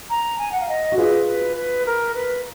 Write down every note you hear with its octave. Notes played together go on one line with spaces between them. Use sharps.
A#5
G#5
F#5
F5
D#5
F#4
F4 G#4 B4
B4
B4
A#4
B4